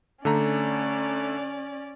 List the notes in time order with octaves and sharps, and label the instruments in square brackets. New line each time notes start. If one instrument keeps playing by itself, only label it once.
[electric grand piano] D3 A3 A#5 [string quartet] C#4 D5